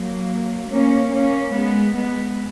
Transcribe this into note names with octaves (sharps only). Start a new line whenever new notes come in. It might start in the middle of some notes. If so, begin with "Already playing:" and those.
Already playing: F#3 A#3
A#3 C#4
A#3 C#4
G#3 B3
G#3 B3